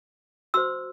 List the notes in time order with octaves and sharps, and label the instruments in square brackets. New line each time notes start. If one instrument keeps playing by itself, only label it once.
[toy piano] F#4 C5 C6 E6